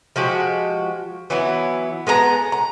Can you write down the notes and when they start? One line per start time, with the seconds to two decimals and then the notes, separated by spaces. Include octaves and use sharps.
0.16 F3 G#3 F#4 G4
1.30 E3 F#3 B3 E4
2.07 G#3 B3 D4 A#5
2.52 A#5